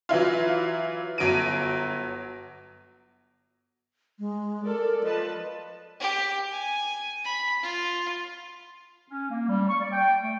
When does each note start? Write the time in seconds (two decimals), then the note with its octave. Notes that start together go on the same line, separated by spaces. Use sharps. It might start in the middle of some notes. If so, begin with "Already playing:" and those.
0.09 E3 F#3 E4 F4
1.18 G1 F#3 D7 D#7
4.19 G#3
4.65 A4 A#4 D5
5.03 F3 B4 D#5 A5
6.00 G4
6.52 G#5
7.24 B5
7.63 F4
9.09 C#4
9.31 A#3
9.49 G3
9.69 C#6
9.80 D5
9.92 G5
10.22 A3